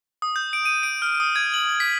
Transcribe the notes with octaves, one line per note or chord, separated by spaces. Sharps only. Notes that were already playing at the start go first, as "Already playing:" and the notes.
D#6
G6
D7
D#7
D7
F6
D#6
G#6
F#7
B6